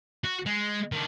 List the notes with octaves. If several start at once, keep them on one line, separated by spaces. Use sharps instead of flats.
F#4
G#3
D#3 D4